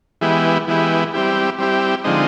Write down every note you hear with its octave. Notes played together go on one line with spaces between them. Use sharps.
E3 G#3 B3 E4 G4
E3 G#3 B3 E4 G4
G3 C4 E4 G4
G3 C4 E4 G4
D3 F3 G#3 C4 D#4